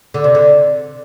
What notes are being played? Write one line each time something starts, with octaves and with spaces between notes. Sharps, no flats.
D3
C3
D3